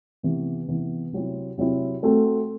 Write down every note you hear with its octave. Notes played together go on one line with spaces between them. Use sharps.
C3 E3 B3
C3 E3 B3
C3 F#3 C4 E4
C3 F#3 C4 E4
A3 C4 F#4 A4